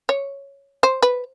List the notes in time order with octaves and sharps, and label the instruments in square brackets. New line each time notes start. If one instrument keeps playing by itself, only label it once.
[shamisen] C#5
C5
B4